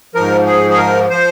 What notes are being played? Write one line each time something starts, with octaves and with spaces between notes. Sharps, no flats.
G#2 F3 A#4
G#4
G#4
A#4
F3 C5